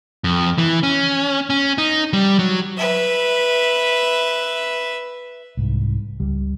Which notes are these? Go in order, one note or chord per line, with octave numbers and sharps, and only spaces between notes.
F2
E3
C#4
C#4
D#4
G3
F#3
B4 E5
C2 G#2
C#2 G3